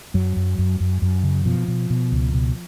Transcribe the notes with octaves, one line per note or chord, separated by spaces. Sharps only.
F#2 F#3
F#2
F#2
F#2
F#2
C#3
B2 F3
B2
B2
C#2
B2